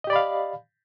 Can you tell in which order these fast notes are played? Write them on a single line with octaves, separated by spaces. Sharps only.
D#5 G4 D5 B5 F5